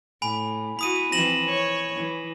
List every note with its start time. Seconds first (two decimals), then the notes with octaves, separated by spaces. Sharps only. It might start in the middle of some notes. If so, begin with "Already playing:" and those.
0.22 A2 G#5 B5
0.79 E4 F#4 B5 D#6 D#7
1.12 E3 F3 C4 A#6 E7 F#7
1.49 C#5
1.96 E3